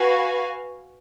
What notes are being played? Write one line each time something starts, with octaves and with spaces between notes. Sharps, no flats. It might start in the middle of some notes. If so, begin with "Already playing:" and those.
Already playing: F#4 B4 F5 G#5